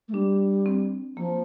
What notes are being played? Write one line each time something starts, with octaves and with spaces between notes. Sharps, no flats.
A3
G3 D4
C4
F3 A#3